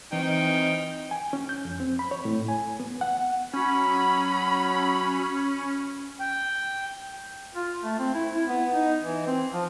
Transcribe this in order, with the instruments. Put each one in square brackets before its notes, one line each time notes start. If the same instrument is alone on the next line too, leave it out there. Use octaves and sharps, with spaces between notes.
[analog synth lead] E3 [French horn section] C4 [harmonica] D#4 G5
[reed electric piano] G#5
C#4
G6
F2
C4
B5
C#5
A2
G#5
B3
F#5
[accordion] F#3 [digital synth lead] C#4 [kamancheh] B5
[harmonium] G5
[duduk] F4
A3
C4
E4
E4
B3
D#4
E3
C4
F3